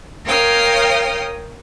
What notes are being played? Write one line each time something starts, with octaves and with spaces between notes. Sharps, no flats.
A#4 C#5 F5 G5 D#6 F6